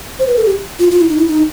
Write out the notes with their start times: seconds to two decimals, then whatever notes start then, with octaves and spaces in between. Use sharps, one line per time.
0.19 C5
0.27 B4
0.37 A4
0.46 G4
0.79 F4
0.91 F4
1.00 E4
1.09 D#4
1.18 E4
1.27 D#4